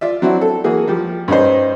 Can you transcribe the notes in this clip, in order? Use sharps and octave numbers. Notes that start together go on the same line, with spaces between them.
F4 D5 E5
F#3 C4 D4 E4 F#4
A4
E3 A#3 F#4 G#4
F3 G3
G2 C#4 D#4 C5